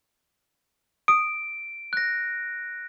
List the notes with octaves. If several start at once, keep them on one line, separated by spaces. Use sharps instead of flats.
D#6 D7
F#6 A#6